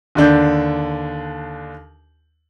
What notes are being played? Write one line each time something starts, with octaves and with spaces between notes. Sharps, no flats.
D#2 D3 D4 G6